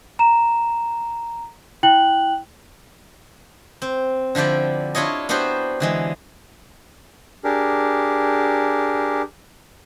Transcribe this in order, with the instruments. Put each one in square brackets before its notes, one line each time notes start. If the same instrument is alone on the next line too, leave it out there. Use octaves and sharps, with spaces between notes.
[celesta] A#5 E7
E4 G5 F#6 F#7
[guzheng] C4
D3 F3 E4 G4 D5
D4 E4 F4 C#5 D#5
B3 D4 E4 F#4 G4 C5
D3 E3 G#3
[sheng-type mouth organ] D4 G4 G#4 A#4